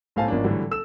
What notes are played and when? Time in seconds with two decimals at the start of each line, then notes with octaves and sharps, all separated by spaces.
0.16 B1 A2 C5 F5 G#5 A5
0.28 G#1 F3 A#3 C#4 D4
0.44 A2 D3 E3 F#3 G3
0.71 A4 E6 E7